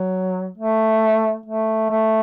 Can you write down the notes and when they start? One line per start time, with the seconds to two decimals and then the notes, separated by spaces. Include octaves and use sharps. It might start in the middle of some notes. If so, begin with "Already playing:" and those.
Already playing: F#3
0.58 A3
1.46 A3
1.90 A3